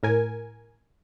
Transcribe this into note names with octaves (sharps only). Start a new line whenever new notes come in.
A2 A#4 G#5